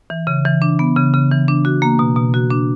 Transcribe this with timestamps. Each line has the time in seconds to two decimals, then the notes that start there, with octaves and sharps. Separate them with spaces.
0.10 E3
0.27 C#3
0.45 E3
0.62 D4
0.79 B3
0.96 C#3
1.14 C#3
1.31 E3
1.48 D4
1.65 F#4
1.82 A#3
1.99 B2
2.16 B2
2.34 F#4
2.51 D4